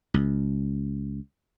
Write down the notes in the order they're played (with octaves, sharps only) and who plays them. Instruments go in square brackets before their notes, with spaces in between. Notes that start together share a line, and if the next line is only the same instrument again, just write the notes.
[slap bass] C#2